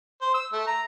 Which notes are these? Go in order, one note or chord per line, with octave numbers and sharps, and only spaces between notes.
C5
E6
A3
A#5